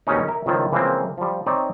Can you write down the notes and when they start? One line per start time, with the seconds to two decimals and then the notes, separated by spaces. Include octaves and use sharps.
0.07 D#2 G#2 B2 G#3 C#4 D#4
0.28 A#4 E5
0.46 C#2 D#3 F3 E4 C5 A5
0.72 C#3 E3 F3 G#3 A#3 C4
1.18 F3 G3
1.46 C4 D#4 C#5 D5